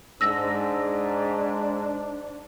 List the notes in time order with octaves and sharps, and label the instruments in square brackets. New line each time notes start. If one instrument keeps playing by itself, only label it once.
[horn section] G#2 [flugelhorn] D4 [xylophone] E6 A#6